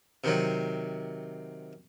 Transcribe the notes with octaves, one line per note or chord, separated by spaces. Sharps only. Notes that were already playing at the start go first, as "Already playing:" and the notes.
C3 D#3 F#3